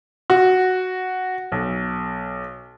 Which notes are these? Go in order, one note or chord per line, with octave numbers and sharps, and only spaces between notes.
F#4
B1